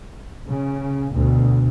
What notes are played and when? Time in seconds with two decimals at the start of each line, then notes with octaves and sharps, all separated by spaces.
0.49 C#3
1.11 D2 B2